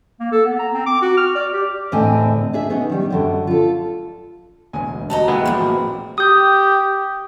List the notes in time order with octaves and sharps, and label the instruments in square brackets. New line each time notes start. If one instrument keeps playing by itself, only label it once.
[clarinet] A#3
A4
B3
A#5
C4
D6
F#4
F6
D5
G4
[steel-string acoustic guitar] E2 A2 D3 C4 D#5 G#5
D4 G#4 E5
B3 C#4 D#4
D#3 G3
F#2 D3 F#3
F4 A4
[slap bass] E1 D2 [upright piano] G#5
[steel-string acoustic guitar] F#4 G4 D#5 [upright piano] A5 A#5
[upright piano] D#2 [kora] G#3 B3 E4
[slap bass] A1 E3 F3 [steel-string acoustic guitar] A#2 F#4
[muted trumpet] G4 [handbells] D#6 G6